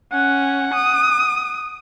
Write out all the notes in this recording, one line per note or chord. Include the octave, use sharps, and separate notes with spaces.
C#4 F#5
D#6